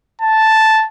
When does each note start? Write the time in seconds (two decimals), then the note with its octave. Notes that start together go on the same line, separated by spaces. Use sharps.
0.21 A5